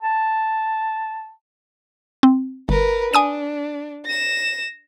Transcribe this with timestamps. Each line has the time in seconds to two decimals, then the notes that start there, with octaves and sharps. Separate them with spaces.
0.01 A5
2.23 C4
2.69 G1 A#4 B4
3.14 D4 G#5 D#6 D#7
4.05 A#6 E7